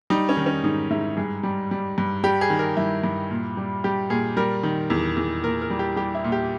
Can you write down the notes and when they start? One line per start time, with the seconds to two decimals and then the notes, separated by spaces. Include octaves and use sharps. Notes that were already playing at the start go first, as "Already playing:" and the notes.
0.10 G3 D#4
0.29 C#4
0.37 D#3
0.46 C#4
0.64 G#2 D#4
0.90 G#2 E4
1.17 G2 G#4
1.43 G3
1.71 G3
1.98 G2
2.24 G3 G4
2.41 G#4
2.50 D#3
2.59 A#4
2.77 G2 E4
3.04 G2
3.31 A#2
3.57 G3
3.84 G3 G4
4.10 A#2 G#4
4.37 G3 A#4
4.63 D#3
4.90 E2
5.17 E2
5.43 A#2 A#4
5.62 A#4
5.70 G3
5.79 G4
5.96 G3 G4
6.15 E4
6.24 A#2
6.32 G4